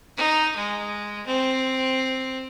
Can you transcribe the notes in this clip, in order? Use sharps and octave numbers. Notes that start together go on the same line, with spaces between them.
D#4
G#3
C4